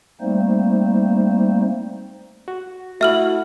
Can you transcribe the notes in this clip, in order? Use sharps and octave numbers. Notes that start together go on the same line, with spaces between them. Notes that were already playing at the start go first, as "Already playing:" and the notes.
G3 A3 A#3 C4 D#4 C5
F#4
A3 E4 F#4 E5 F6 F#7